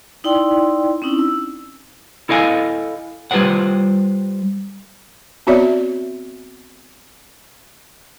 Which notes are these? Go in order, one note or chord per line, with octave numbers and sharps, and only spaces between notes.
D#4 E4 D5 G5 C6
C4 C#4 D#4 E4
E6
E4 A4 D#5 F5 G#5
G3 F4 G4 B4 C5 F#5
B3 C4 F#4 C#5 D5 E5